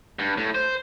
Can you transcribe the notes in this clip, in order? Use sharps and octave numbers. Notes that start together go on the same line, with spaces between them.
G2
A2
C5